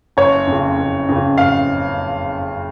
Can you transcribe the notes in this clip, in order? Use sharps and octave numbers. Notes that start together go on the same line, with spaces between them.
F#1 C#5
F2
C#3
F#1
F2 C#3
F#1 F5